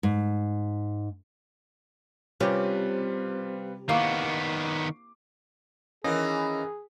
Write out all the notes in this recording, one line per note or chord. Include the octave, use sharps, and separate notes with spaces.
G#2
C3 G3 C#4 F4 G4 B4
D#3 A#3 B3 E4 C#6 D6 C7
D#3 E3 A#3 C#4 G#4 D#5 A#6